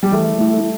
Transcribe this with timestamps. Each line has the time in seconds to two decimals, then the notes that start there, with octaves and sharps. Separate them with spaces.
0.03 G3
0.12 E3 A3
0.39 A3 E4